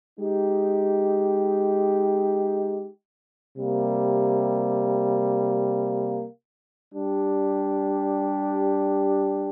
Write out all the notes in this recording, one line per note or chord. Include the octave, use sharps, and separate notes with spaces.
G#3 D#4 G4
C3 G3 A#3
G3 D4 G4